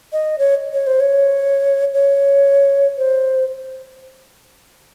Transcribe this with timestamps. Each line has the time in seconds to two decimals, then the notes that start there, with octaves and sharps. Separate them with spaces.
0.13 D#5
0.39 C#5
0.73 C#5
0.87 C5
1.00 C#5
1.94 C#5
2.98 C5